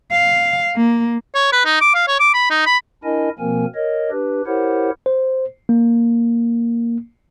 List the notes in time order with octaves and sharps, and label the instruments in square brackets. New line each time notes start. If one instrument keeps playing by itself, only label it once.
[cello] F5
A#3
[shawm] C#5
B4
D#4
D6
F5
C#5
D6
B5
D#4
B5
[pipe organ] D4 E4 A#4 D#5 G#5
B2 F3 A#3 C4 A#4 G#5
A#4 C#5 D#5
D4 G4 B4
E4 G4 A#4 C5 C#5 F#5
[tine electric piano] C5
A#3